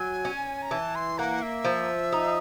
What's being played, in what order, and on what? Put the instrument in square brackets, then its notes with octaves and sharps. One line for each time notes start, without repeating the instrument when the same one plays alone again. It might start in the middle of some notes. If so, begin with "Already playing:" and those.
Already playing: [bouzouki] F#3 [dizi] G#5
[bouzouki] C#4
[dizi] A#5
[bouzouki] E3 [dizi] A5
[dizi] C6
[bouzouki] A#3 [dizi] F#5
[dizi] E5
[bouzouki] F3
D#4